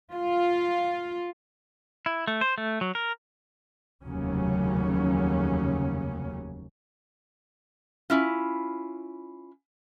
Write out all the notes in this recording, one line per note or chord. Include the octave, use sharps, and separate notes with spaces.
F4
E4
A3
C5
A3
F#3
A#4
F1 D#2 C#3 F#3 C#4
C#4 E4 F4